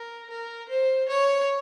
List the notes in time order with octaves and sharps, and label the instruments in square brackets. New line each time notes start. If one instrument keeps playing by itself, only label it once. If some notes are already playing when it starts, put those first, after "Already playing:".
Already playing: [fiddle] A#4
A#4
C5
C#5